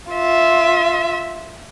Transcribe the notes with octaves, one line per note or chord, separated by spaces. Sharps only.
F4 E5